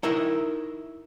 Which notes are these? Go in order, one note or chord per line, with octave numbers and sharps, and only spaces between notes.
D#4 E4 A#4 E5